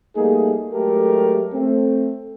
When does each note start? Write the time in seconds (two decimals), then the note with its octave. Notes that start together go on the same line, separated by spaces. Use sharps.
0.16 G3 A3 A#3 D#4 G#4
0.73 F#3 G#3 A3 G4 A4 A#4
1.53 A3 C4